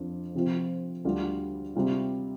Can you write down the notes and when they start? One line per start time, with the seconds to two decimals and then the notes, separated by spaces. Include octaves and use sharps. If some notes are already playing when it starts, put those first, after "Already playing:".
Already playing: F2 F3 D4 F4
0.34 C3 F3 C4 F4
1.04 D2 D3 G3 D4 F4
1.75 C3 G3 F4